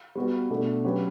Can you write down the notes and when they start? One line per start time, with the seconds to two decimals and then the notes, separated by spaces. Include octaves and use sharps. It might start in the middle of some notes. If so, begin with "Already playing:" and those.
0.15 G3 B3 F#4 B4
0.50 B2 A3 D4
0.84 F#3 C#4 G4 B4